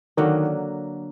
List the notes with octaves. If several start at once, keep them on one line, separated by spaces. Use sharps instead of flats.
D3 D#3 F#3 A#3